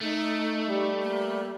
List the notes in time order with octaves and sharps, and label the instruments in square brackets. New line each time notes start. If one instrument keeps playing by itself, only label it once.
[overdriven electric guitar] A3 [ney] D#4
[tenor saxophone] G3
[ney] A#3